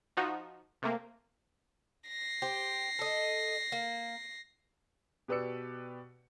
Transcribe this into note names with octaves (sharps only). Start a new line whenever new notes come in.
F3 D#4 F#4
C3 A3 A#3
A#6 C7
G4 C5
A4 D#5
A#3
B2 G4 B4 D5 E6 C#7